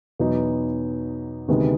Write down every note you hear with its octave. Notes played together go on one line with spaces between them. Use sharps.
E2 B2 F#3 B3 D#4
D2 C3 D#3 G#3 B3